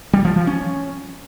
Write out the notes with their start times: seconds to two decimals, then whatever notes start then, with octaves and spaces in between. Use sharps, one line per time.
0.13 G3
0.25 F3
0.36 F3
0.47 C#4